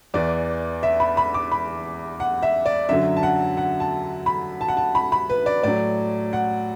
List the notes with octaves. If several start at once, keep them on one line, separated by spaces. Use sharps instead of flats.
E2 E3 D5
E5
B5
B5
D6
B5
F#5
E5
D5
F#2 D3 F#3 E5
A5
F#5
F#5
A5
B5
A5
F#5
A5
B5
B5
B4
D5
A2 F#3 D5
F#5